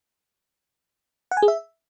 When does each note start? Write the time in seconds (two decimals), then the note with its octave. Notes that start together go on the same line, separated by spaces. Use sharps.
1.31 F#5
1.37 G#5
1.42 G#4
1.48 E5